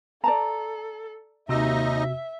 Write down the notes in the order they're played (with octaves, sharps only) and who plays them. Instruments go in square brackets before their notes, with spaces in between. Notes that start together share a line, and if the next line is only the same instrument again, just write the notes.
[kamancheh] A4 [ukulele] D5 A5 A#5
[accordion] D#2 D#4 D#5 [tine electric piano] C3 F#4 E6 [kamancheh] E5